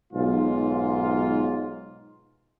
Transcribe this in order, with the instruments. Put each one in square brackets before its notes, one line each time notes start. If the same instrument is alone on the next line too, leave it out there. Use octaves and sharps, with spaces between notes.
[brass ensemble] B1 G#2 F4